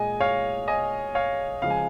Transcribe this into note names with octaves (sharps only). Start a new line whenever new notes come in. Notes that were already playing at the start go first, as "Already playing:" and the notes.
Already playing: A#2 G#3 D#5 G#5
C#5 F5
D#5 G#5
C#5 F5
C#3 F3 G#3 F5
G#5